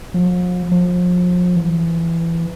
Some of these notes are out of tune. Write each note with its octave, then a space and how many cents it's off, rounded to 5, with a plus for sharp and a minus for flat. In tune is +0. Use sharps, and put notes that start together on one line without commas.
F3 +45
F3 +35
E3 +20